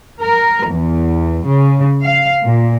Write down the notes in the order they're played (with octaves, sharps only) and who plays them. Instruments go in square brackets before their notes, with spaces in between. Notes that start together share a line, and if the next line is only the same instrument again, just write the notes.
[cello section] A#4
E2
C#3
F5
A#2